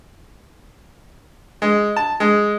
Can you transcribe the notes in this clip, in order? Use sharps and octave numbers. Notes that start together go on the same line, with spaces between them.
G#3
A5
G#3